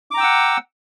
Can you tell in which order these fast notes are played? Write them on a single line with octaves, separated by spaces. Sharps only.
D6 A#5 G5 E6 F#5